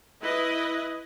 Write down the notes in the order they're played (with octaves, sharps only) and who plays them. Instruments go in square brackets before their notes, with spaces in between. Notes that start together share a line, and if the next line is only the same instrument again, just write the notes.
[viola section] E4 B4 D#5